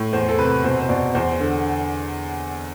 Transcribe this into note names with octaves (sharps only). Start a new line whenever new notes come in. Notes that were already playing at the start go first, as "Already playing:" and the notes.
Already playing: A2
E2 C5
A4
C3 B4
B2 C5
C5
B2 D5
E2 C5
D3